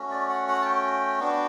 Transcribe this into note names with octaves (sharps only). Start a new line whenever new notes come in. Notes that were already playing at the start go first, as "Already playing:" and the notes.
Already playing: A3 C#4 F#4
D5
F#5
F#5
A5
G5
B3 D4 F#4